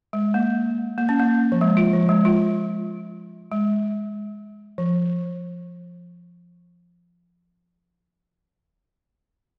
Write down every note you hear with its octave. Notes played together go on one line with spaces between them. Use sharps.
G#3
A#3
A#3
C#4
A#3
F3
G#3
F4
F3
G#3
F4
G#3
F3